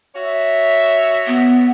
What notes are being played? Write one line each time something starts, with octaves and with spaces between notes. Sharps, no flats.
F#4 C#5 E5
B3